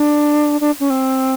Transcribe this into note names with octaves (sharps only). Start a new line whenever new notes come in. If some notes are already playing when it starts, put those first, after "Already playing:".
Already playing: D4
D4
C#4
C4